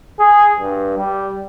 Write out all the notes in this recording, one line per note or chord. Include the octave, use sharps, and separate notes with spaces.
G#4
G2
G3